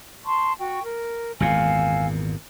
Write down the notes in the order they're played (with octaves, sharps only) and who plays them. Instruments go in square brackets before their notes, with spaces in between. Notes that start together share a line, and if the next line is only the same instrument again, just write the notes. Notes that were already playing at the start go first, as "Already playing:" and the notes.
[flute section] A5 C6 C#6
F#4 G5 C#6
A#4
[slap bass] G#1 E2 A#2 [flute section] F5 G#5 E6